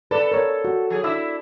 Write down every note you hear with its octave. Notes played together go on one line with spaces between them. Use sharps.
A4 B4 D5
A#4 C#5
F#4
F#3 G#4
D4 E4 E5 E6